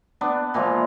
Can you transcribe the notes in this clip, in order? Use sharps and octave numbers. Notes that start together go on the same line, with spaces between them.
B3 D4
A#2 E3 F3 G#3